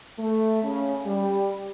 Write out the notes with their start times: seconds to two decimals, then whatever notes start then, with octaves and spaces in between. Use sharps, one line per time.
0.18 A3
0.63 C#3
1.05 G3